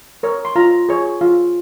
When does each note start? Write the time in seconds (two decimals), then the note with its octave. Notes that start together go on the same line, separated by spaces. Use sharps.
0.23 A#4 C#5
0.45 C6
0.56 F4 A#5
0.89 G#4 C#5
1.21 F4